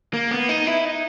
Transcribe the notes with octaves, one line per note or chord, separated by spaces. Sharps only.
A#3
B3
D#4
E4
D#4